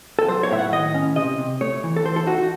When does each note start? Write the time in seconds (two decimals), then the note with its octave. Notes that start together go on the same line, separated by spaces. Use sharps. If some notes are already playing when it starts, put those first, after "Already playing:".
0.19 A4
0.28 F#3 C5
0.43 C#5
0.51 A2 E5
0.58 F#5
0.72 D#3 D#5
0.94 C#4
1.16 C3 D#5
1.38 C3
1.61 A3 C#5
1.83 E3
1.96 A4
2.05 E3 C5
2.16 A4
2.26 D#4 F#4
2.38 F#4